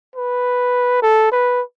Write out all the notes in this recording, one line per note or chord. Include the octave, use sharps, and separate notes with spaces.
B4
A4
B4